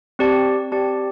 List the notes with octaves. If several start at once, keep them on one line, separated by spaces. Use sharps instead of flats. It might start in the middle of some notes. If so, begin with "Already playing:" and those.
C4 G4 D5 A5
C4 G4 D5 A5